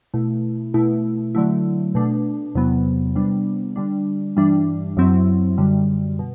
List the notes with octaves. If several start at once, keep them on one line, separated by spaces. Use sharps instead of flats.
B2 A3 E4
B2 A3 E4
D3 F#3 A3 E4
B2 A3 D4
E2 C3 F#3 B3
C3 G3 B3 D4
D3 G3 D4
G2 E3 G3 D4
F#2 F#3 C4 E4
F#2 D3 G3
B2